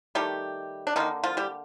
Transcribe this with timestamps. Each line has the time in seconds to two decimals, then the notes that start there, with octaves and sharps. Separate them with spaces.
0.15 D#3 G3 A3 G4
0.87 D4
0.96 D3 D#3 G3 D#4
1.00 A#3
1.23 F3 F4
1.37 G3 G4